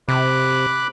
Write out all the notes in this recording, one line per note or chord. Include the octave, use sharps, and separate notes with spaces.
C3 B5 D6 F#6